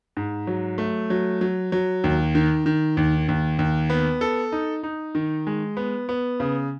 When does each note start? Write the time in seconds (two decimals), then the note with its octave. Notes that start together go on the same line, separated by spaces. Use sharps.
0.17 G#2
0.47 F#3
0.78 A3
1.10 F#3
1.41 F#3
1.72 F#3
2.04 D#2
2.35 D#3
2.66 D#3
2.97 D#2
3.28 D#2
3.59 D#2
3.90 B3
4.21 A4
4.52 D#4
4.83 D#4
5.15 D#3
5.47 G#3
5.77 B3
6.09 B3
6.40 C#3